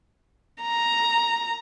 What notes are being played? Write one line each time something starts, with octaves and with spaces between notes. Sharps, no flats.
A#5